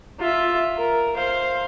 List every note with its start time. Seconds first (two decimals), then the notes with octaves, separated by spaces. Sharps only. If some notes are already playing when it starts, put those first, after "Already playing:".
0.20 F4 E5
0.77 A#4
1.14 C5 F5